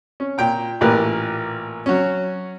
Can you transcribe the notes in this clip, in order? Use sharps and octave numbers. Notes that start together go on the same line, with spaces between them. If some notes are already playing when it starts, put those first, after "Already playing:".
C#4
A#2 G5 A#5
A1 A#2 G4 A#4 B4
F#3 C#4